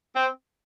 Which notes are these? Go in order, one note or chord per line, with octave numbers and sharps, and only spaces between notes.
C4